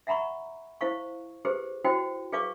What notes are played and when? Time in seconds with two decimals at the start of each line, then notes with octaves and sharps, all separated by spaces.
0.07 E5 F#5 A#5 B5 C#6
0.81 E4 C5 F5 C#6
1.45 G4 G#4 B4 C5
1.84 E4 F#4 C5 G5 C6
2.32 G#4 B4 D5 F5 C#6 D6